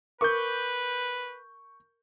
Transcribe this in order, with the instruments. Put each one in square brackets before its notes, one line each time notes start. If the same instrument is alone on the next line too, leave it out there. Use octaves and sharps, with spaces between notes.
[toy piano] A#4 D6 [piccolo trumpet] B4 [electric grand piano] C#6 G6